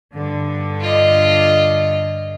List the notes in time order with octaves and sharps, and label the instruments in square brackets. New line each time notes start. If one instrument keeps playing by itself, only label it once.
[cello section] G2 D3
[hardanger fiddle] F4 D#5